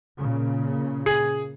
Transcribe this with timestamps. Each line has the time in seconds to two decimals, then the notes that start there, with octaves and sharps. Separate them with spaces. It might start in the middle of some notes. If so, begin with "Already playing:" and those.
0.18 A#2 C#3
1.06 G#4